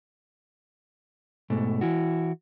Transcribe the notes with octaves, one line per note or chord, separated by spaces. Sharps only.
G#2 B2 A3
E3 E4 F#4